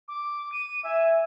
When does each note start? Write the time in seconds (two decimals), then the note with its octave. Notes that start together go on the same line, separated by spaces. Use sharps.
0.08 D6
0.52 D#7
0.84 E5 G#5